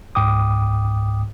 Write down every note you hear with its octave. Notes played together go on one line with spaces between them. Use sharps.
C#2 G#2 G5 D6 D#6